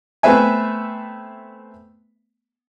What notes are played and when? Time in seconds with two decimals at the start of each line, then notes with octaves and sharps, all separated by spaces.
0.23 A3 B3 C4 B4 E5 G#5